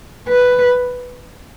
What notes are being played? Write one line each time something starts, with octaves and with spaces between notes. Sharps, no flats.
B4